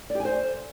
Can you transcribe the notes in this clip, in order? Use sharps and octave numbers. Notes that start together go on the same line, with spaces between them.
D5
G4
G#5
C5